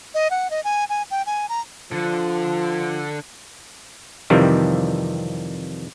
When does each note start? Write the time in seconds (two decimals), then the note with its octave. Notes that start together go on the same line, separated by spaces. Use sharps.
0.14 D#5
0.31 F#5
0.51 D#5
0.64 G#5
0.89 G#5
1.11 G5
1.26 G#5
1.49 A#5
1.92 D3 F3
4.30 F2 C3 D#3 E3 G3